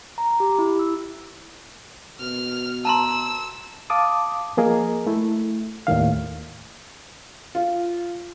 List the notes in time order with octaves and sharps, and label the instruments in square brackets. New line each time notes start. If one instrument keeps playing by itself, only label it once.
[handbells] A#5
G4
E4
E6
[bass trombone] B2 [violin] F6
[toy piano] A5 A#5 C6 [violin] E6
[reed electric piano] F5 A5 D6 D#6
F3 A#3 G#4 A#4 D#5
A3 E4
D#2 A2 D#3 F5
[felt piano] F4